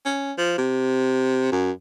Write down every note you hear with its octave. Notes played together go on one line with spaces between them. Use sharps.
C#4
F3
C3
F#2